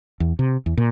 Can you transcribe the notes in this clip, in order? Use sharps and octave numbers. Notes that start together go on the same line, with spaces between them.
E2
C3
E2
A#2